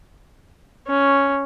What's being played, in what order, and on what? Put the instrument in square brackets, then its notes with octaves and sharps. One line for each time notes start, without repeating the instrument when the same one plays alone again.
[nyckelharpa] C#4